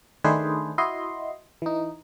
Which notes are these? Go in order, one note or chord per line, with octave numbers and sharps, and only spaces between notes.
D#3 A3 D4 G#4 B4 C5
E4 F#4 D#5 C6
E3 D#4